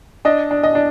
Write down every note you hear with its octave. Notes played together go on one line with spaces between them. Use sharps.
D4 D#5
D4
D#5
D4